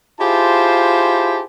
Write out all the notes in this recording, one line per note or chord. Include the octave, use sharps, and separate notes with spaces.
E4 F4 G4 G#4 C5 A5